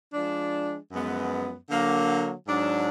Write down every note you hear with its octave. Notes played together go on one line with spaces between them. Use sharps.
F3 G#3 D4
F#2 F3 G#3 B3
D3 F#3 A#3
G#2 F#3 D4